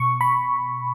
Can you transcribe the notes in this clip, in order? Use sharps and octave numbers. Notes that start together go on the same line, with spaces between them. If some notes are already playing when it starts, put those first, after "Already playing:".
Already playing: B2 C#6
B5